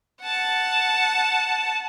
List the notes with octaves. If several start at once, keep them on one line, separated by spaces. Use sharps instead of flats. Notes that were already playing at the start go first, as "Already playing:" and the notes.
F#5 A5